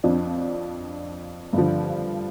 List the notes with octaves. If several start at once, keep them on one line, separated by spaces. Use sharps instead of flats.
F2 F3 D4
G2 D3 F3